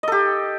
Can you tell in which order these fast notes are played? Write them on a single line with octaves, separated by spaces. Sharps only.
D#5 A4 G4